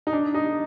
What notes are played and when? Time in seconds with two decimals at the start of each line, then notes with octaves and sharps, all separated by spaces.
0.07 D#4
0.13 D4
0.34 D#4